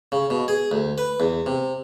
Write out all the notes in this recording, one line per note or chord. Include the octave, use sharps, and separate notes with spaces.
C#3
B2
G#4
D2
B4
E2
C3